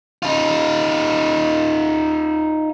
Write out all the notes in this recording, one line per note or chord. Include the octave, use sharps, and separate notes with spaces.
D#4 F4